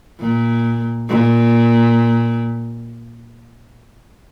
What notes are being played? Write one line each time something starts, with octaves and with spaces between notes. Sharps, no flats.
A#2
A#2